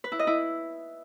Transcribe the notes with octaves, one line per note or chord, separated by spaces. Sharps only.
B4
E4
D#5
E4